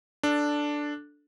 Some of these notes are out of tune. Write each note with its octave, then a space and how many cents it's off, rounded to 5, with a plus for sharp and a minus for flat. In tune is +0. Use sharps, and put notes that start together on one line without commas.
D4 +0 A4 +0